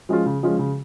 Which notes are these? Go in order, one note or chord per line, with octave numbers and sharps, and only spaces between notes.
F3 G#3 C#4 F4
C#3
F3 G#3 C#4 F4
C#3